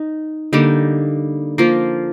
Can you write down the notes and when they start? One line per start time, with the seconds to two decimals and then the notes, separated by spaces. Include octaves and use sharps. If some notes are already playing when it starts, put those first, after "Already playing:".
Already playing: D#4
0.53 D3 G3 A#3 D#4
1.58 F3 A#3 F4